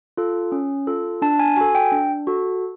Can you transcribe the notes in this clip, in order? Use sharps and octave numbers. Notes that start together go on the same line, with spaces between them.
F4 A4
C#4
F4 A4
D4 A5
G#5
F#4 A4 G#5
G5
D4
F#4 A4